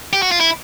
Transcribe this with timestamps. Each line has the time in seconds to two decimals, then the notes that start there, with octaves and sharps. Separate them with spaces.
0.13 G4
0.22 F#4
0.32 F4
0.40 E4